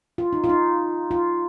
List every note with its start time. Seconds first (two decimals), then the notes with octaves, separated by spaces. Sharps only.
0.18 F4
0.33 D#4
0.44 F4
0.49 D#4
1.11 F4